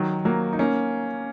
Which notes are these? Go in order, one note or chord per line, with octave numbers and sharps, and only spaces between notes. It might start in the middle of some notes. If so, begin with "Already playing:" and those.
Already playing: D#3 F#3
F#3 A#3
D#4
A#3 C#4